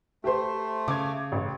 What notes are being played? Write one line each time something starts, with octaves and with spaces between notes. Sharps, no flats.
A3 G4 C5
C#3 D6 G#6
A1